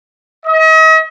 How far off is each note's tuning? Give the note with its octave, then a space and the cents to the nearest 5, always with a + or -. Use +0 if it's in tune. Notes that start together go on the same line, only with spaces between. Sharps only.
D#5 +40